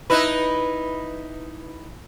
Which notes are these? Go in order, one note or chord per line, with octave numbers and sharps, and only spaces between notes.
D#4 E4 B4